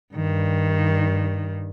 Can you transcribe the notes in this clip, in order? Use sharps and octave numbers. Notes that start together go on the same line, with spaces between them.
G2 D#3